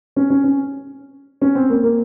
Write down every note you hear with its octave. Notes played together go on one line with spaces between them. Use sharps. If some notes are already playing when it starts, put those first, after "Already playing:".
C#4
C#4
C#4
C#4
C4
A#3
A#3